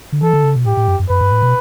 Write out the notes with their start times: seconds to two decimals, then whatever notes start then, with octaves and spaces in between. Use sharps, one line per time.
0.12 D3
0.22 E3 A4
0.34 D3
0.44 C#3
0.56 B2
0.66 A2 G4
0.77 A2
0.88 F#2
1.00 F#2
1.10 F#2 B4
1.21 G2
1.32 A2
1.42 B2